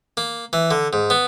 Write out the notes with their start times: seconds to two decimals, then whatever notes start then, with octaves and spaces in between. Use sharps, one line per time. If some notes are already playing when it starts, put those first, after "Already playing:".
0.17 A#3
0.53 E3
0.71 D3
0.93 G#2
1.10 B3